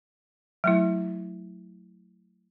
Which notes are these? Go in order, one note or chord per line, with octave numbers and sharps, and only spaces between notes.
F#3 A3 E4